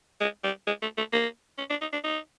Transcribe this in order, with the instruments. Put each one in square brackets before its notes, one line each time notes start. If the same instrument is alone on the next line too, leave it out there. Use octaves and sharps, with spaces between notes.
[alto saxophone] G#3
G3
G#3
A3
A3
A#3
C#4
D4
D#4
D4
D#4